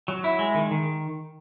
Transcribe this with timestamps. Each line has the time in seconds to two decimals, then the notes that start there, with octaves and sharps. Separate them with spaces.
0.08 F#3
0.24 E4
0.39 G#3
0.55 D#3
0.71 D#3